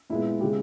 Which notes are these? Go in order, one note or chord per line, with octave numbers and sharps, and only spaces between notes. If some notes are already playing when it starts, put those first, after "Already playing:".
A#2 G#3 B3 E4
C#3 G#3 B3 G4